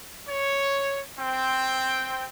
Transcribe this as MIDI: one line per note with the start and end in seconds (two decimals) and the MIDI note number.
0.28 1.00 73
1.19 2.27 60
1.19 2.27 79